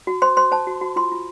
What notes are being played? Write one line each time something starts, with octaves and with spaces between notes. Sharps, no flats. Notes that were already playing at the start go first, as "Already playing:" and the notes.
F#4
C5 C6
C5 C6
C5 A5
F#4
F#4
F4 C6
F4